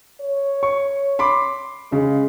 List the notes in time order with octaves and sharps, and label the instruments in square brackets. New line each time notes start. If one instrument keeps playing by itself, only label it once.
[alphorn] C#5
[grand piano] C#6
B5 C6 D6
[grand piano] C#3 [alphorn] G#3